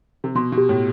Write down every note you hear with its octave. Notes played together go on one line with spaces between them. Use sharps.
C3
B2 C6
B2
G4
A2